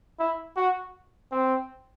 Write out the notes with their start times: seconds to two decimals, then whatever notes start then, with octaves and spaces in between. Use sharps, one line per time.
0.20 E4
0.57 F#4
1.32 C4